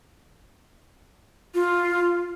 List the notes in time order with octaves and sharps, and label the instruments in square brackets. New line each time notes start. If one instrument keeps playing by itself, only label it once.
[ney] F4